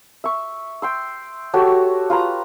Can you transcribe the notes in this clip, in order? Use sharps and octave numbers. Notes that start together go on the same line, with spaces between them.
E5 C#6
G5 C6 E6
F#4 G4 A4 C#5
F4 B4 A#5